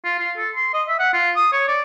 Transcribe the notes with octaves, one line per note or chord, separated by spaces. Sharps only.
F4
F4
A4
C6
D#5
E5
F#5
F4
D#6
C#5
D5